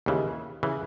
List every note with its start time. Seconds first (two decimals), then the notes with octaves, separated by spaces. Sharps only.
0.06 D#2 C#3 E3
0.63 C#3 E3